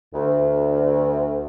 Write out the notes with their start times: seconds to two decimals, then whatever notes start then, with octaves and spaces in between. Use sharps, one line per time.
0.14 D2